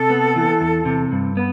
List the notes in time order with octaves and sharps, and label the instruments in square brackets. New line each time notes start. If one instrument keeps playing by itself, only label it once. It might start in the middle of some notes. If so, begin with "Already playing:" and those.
Already playing: [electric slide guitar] C3 [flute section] A4
[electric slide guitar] B3
E3
E2
C3
G2
B3